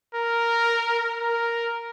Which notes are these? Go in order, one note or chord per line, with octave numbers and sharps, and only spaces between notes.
A#4
A#4